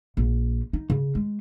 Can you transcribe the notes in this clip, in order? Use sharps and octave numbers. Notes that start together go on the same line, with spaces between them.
A#1
D#4
C#3
G#3